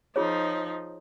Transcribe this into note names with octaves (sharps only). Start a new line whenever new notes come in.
F3 D#4 F4 G#4 C#5